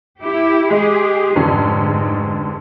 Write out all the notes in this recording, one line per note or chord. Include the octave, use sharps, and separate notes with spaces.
E4 G4
G#3 G4 G#4
F1 G#2 D3 C#4